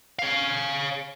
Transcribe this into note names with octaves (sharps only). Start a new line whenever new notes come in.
C#5 F5